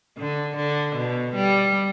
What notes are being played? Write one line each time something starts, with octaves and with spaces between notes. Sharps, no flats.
D3
D3
B2
G3